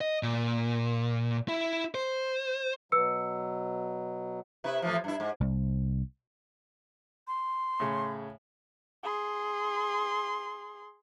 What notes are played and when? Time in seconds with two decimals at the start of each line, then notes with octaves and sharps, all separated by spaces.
0.01 D#5
0.23 A#2
1.49 E4
1.95 C5
2.92 B2 F#3 B4 E6 C#7
4.64 C3 E4 B4
4.82 A2 E3 F3
5.04 G2 E4
5.20 G#2
5.41 C2
7.27 C6
7.80 A2 C#3
9.03 G#4 C6